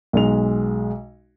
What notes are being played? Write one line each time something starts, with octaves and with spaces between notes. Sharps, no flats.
B1 G#3 F7